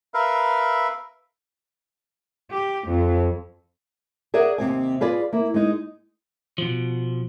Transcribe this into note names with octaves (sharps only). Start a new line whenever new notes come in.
A#4 B4 E5 F5
G4
F2
G#4 A#4 D5 E5 F#5
D#2 C3 C4 G#5
F4 G#4 B4 D5
A#3 E4
G#3 D#4
B2 F3